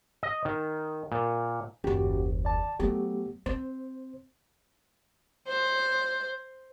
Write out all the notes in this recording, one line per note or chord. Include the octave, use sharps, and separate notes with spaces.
D#5
D#3
A#2
F#1 D#2 C#4 F#4 G4
D5 A5
F#3 A3 B3 G4
C4 C5
C5